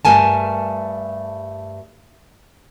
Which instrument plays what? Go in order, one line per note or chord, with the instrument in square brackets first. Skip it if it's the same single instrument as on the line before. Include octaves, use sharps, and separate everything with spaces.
[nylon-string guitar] G2 G3 A3 A#4 G#5 A5